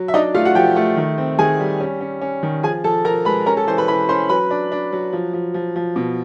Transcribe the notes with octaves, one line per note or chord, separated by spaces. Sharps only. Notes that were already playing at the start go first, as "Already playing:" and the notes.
Already playing: F#3
E5
D4 D#4 D#5
A3 F4 F5
F#4 F#5
F3 G4 G5
A3
D#3
C4
D#3 G#4 G#5
G3
C#4
C#4
C#4
D#3
F3 G#4 G#5
F3 A4 A5
F3 A#4 A#5
G#3 B4 B5
C#4 A#4 A#5
A4 A5
E3 C5 C6
B4 B5
E3 B4 B5
C#4 C5 C6
F#3 B4 B5
D4
D4
F#3
F3
F3
F3
F3
B2